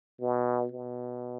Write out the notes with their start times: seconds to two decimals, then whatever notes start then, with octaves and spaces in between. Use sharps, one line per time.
0.21 B2
0.72 B2